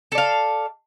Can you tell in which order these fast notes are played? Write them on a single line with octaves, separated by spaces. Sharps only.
A4 D5 F5